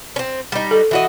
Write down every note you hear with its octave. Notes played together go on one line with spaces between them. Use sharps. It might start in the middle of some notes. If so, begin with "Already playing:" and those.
C4 C#4
G3 D#4
A4
E3 F#4 D#5